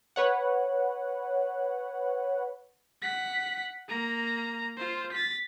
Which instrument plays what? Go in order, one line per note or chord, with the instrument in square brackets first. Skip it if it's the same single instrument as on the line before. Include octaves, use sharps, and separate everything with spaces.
[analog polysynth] B4 C#5 F#5
[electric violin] F#5 B6
A#3 A#5
F4 C5
A6 B6